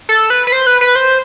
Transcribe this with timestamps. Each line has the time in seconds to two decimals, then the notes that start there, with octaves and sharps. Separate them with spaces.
0.09 A4
0.30 B4
0.47 B4
0.52 C5
0.67 B4
0.81 B4
0.95 C5